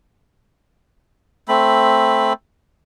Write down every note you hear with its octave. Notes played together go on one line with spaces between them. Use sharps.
A3 C4 B5